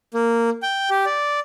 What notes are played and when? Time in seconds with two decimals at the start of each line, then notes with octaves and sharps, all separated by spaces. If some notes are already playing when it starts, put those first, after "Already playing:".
0.14 A#3
0.62 G5
0.90 G4
1.06 D5